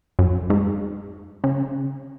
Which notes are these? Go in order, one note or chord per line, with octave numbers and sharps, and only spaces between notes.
F#2
G#2
C#3